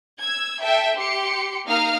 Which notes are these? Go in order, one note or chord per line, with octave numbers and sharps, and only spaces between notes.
E6 G#6
A4 E5 G5
G4 C6 C#7
A#3 D#4 F5 A#5 D#6 F6